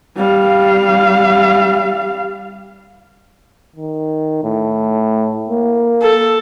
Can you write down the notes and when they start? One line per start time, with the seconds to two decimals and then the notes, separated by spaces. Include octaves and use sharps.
0.17 G3 F5
3.76 D#3
4.44 A2
5.49 A#3
6.02 A4